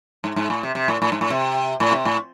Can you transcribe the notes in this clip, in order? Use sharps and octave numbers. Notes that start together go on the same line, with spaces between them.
G#2
G#2
A2
C3
C3
A2
A2
G#2
A2
C3
A2
C3
A2